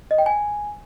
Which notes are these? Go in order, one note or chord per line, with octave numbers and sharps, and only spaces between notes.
D#5
G5
G#5